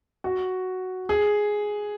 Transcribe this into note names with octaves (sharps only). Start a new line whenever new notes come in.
F#4
G#4